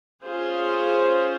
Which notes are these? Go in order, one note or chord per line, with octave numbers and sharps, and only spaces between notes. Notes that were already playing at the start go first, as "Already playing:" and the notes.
C#4 F4 G#4 C5